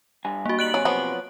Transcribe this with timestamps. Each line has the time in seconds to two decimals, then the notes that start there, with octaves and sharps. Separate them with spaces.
0.25 G2 G3 G#5
0.46 A#3 F#4
0.59 G3 D#4 F#6 D7 F#7
0.74 C3 F#3 G#5
0.85 F3 F#3 B3